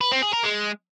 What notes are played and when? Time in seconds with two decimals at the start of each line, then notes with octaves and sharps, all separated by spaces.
0.01 B4
0.12 C4
0.23 G#4
0.33 A#4
0.44 G#3